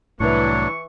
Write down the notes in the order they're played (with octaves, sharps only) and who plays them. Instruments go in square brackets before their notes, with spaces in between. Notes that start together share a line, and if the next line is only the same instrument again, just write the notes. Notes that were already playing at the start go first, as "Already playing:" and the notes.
[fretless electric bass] C2 A2 [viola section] E3 [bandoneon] F#3 D4 [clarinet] C#6